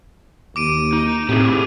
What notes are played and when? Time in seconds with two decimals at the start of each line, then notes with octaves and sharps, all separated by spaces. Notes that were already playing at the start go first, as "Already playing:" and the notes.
0.56 D#2 D6 D7 D#7
0.93 D#4
1.29 A2 C4 G4 G#4